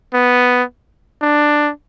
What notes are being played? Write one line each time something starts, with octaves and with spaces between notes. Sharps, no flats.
B3
D4